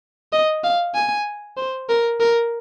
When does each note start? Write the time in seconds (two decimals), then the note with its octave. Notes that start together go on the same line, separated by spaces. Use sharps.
0.33 D#5
0.64 F5
0.95 G#5
1.57 C5
1.89 A#4
2.20 A#4